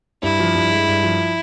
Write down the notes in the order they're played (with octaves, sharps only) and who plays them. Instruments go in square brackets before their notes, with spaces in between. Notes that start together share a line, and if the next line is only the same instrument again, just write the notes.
[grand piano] G2 [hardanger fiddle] E4
[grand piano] F3
G2
G#3
G2
F3